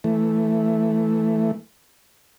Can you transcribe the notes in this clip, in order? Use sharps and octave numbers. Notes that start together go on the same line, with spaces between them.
E3 A3